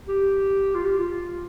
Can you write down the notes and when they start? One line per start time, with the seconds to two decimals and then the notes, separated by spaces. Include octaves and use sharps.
0.08 G4
0.75 F4
0.86 G4
0.99 F4